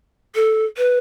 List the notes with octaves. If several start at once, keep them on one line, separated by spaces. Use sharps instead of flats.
A4
B4